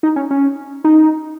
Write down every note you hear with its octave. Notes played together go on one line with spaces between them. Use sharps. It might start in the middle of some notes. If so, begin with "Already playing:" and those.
D#4
C#4
C#4
D#4